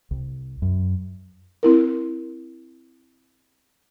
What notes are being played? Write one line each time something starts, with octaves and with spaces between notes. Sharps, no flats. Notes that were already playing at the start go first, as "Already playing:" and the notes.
C2
F#2
C4 E4 A#4